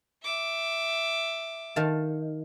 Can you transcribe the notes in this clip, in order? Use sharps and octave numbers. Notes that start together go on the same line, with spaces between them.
E5 D6
D#3 F5 A5